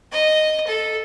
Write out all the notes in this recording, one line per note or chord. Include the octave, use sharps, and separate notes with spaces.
D#5
A4